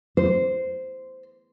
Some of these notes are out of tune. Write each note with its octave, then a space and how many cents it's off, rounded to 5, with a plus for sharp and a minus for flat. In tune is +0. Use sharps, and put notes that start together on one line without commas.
C5 -10